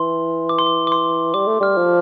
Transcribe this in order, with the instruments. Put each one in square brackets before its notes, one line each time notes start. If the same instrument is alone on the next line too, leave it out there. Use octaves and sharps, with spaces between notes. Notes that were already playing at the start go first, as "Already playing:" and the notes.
Already playing: [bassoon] E3 [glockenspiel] C6
[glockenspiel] D6
C6
D6
D6
C6
[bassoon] G3 [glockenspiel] D6
[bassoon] A3
[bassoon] G3 [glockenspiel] F6
[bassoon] F3